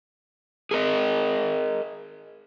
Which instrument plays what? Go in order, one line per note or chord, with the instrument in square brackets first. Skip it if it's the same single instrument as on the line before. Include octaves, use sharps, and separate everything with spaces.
[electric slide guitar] G#4 A#4 D#5